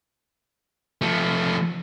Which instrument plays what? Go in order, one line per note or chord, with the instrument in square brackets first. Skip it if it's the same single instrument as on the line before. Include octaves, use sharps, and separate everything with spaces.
[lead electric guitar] F3 A3